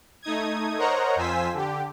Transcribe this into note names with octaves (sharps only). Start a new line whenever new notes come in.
A3 D#4 D#6 G#6
A#4 C5 C#5 D#5 F#5 A#5
F2 F4 C5 G#5 E6 B6
D3 G4